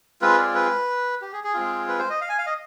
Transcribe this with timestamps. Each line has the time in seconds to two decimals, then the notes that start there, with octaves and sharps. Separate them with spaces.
0.22 G#3 C4 F4 B4
0.38 D5
0.55 B4
1.22 G4
1.33 G#4
1.44 G#4
1.54 G#3 C4 F4
1.88 B4
1.99 C5
2.10 D#5
2.21 F5
2.29 G#5
2.38 F5
2.46 D#5